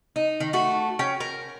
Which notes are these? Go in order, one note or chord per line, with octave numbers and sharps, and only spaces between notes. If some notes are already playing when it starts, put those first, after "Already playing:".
D#4
D#3
A3 F#4
C#4 G5
A#4